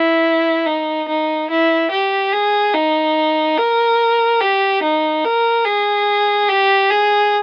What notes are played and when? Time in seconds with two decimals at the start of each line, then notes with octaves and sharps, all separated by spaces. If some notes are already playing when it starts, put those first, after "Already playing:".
Already playing: E4
0.66 D#4
1.08 D#4
1.50 E4
1.91 G4
2.33 G#4
2.74 D#4
3.58 A#4
4.41 G4
4.83 D#4
5.24 A#4
5.65 G#4
6.49 G4
6.90 G#4